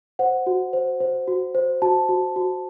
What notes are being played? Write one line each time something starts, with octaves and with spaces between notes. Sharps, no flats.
C5 F#5
F#4
C5
C5
F#4
C5
F#4 A5
F#4
F#4